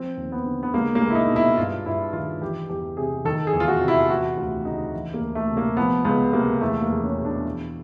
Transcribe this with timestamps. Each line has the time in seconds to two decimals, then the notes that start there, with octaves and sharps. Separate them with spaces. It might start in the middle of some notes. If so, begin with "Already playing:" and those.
Already playing: F3 C4
0.17 D#2
0.32 B3
0.46 D3
0.63 B3
0.74 C#2 A#3
0.95 A#3
1.01 C#2
1.10 E4
1.15 D#4
1.30 B2
1.36 E4
1.57 G2 F4
1.86 G2 E4
2.13 D#3 F4
2.41 E3 G4
2.69 E2 G4
2.97 C3 G#4
3.25 D#3 A4
3.47 G#4
3.53 E2
3.60 F4
3.68 F#4
3.81 C3
3.88 E4
4.10 E3 F#4
4.37 D2 F4
4.65 C#3 D#4
4.93 E3
5.14 A#3
5.21 D2
5.35 A3
5.50 C3
5.57 A#3
5.77 F3 B3
6.05 C#2 B3
6.33 C3 A#3
6.61 E2 A3
6.82 A#3
6.89 E2
7.04 C#4
7.18 B2
7.25 D4
7.45 E3